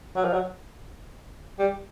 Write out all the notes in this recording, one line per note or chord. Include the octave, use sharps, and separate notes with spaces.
F#3
F3
F#3
G3